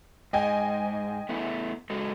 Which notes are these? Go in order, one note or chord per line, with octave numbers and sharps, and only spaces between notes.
G#2 D#5 G5 G#5
A3 B3 E4
G#3 F#4 A4